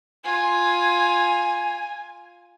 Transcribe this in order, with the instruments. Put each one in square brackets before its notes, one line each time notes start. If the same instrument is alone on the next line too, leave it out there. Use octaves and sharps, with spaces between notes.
[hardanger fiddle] F4 [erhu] G#5